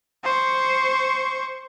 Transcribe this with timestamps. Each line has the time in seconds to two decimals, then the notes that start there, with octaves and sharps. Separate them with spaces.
0.24 C5 C#6